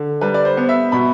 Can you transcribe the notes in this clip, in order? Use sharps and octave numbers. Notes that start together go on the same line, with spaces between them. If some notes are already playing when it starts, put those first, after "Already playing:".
Already playing: D3
G3 B4
D5
C5
B3
E5
B2 B5